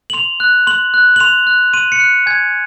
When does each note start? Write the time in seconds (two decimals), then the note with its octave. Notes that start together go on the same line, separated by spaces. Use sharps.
0.10 F#7
0.14 C6 F7
0.40 F#6
0.67 C6 F#7
0.94 F#6
1.16 F#7
1.20 C6 F7
1.47 F#6
1.74 C6 D#7
1.92 C#7
2.00 F#6
2.26 G#5 G#6